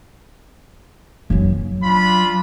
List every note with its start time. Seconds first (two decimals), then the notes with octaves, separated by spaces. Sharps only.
1.30 F#2 F#3
1.84 D4 F4 B5